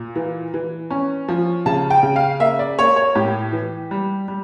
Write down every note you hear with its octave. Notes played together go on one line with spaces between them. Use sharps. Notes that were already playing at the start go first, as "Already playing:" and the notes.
Already playing: A#2
E3
E3
C#4
F3
C#3 A5
G5
C#3
F5
A#3 E5
D5
A#3 C#5
C#5
A2 G4
E3
G3
G3